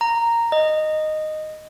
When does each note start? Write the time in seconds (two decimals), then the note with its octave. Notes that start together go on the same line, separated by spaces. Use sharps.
0.01 A#5
0.52 D#5